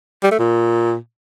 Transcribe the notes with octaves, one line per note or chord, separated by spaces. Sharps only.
G3
A3
A#2